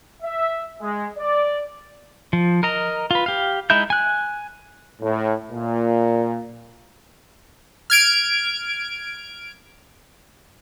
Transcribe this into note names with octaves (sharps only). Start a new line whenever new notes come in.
E5
G#3
D5
F3
A#4 D#5 A#5
F4 B4
G4 F5
G#3 D#4 E4 E5 G6
G#5 F#6
A2
A#2
F6 G#6 D7